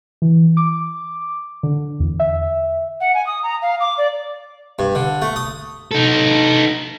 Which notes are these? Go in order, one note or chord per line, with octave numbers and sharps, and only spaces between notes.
E3
D6
D3
E2
E5
F#5
G#5
D#6
A#5
F5
D6
D5
G2
D3
A3
D#6
D#4 A4